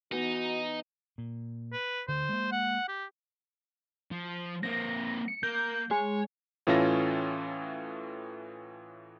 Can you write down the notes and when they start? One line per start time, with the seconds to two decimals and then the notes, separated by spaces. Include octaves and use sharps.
0.12 E3 B3 D#4 F#4
1.18 A#2
1.73 B4
2.08 D2 D3 C5
2.29 G#3 A#3
2.52 F#5
2.88 G4
4.11 F3
4.63 A#3 C4 A#6
5.28 C#7
5.43 A#3 G6
5.91 G#3 C#5
6.67 A2 E3 C#4 F4 A4 A#6